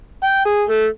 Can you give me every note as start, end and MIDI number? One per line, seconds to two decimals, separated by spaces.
0.24 0.40 79
0.46 0.62 68
0.69 0.86 57